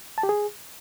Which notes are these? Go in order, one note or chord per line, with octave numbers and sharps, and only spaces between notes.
A5
G4
G#4